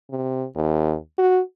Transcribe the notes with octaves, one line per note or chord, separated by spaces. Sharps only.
C3
D#2
F#4